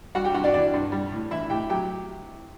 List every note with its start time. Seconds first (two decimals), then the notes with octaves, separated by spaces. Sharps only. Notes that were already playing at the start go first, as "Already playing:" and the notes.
0.15 G3 F#4 F#5
0.25 G4 G5
0.34 G2 F#4 F#5
0.44 D4 D5
0.54 E3 D4 D5
0.74 G2
0.92 G3
1.12 A2
1.31 E3 E4 E5
1.50 A2 G4 G5
1.70 F#3 G4 G5